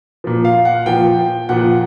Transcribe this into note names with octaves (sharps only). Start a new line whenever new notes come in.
A#2 F3
F5
F#5
A#2 F3 G5
A#2 F3 F#5